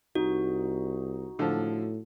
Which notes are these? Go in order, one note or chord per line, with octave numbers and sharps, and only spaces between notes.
C2 D#4 F#4
A2 D3 F3